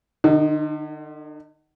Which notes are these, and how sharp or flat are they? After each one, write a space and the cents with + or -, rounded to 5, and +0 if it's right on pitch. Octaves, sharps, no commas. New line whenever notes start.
D3 +45 D#4 +0